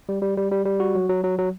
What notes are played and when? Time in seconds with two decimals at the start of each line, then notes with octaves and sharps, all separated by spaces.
0.09 G3
0.22 G3
0.37 G3
0.51 G3
0.65 G3
0.80 F#4
0.95 F#3
1.09 F#3
1.24 F#3
1.38 F#3